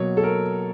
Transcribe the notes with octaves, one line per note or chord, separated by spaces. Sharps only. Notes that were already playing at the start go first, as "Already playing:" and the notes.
Already playing: B2 F#3 A#3 C#5
A4
A#4